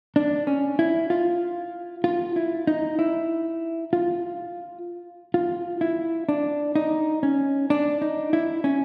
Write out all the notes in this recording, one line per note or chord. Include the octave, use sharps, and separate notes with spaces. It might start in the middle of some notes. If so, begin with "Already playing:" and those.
D4
C#4
E4
F4
F4
E4
D#4
E4
F4
F4
E4
D4
D#4
C#4
D4
D#4
E4
C#4